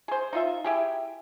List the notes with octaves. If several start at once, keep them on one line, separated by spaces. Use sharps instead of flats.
G#4 C5
D#4 F4 E5
E4 G4 G#4